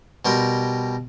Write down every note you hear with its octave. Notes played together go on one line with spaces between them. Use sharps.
B2 G3 A#4 G5 C6